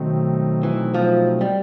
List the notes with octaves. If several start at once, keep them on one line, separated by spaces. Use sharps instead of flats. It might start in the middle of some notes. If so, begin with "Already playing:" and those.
Already playing: B2 D#3 F#3 A3 C4 D#4
E3
F3
G3